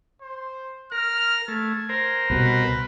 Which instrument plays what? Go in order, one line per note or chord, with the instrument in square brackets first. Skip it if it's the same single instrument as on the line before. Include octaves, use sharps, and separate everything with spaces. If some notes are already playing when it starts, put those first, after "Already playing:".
[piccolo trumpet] C5
[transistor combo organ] A#4 [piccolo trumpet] F6
[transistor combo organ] A3 [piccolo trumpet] G#6
[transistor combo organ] A#4 C5
[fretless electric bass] C2 B2 [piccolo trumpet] B4